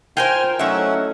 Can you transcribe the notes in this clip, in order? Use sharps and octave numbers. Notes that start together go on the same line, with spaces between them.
F4 A#4 C5 G5 G#5 F6
F#3 A3 C#4 D#4 E4 E5 F#5